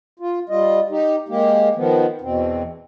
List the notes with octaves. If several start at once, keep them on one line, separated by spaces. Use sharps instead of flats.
F4
G3 F4 D#5
D#4 G4
G#3 A#3 G4
D#3 F3 B3
E2 B2 C4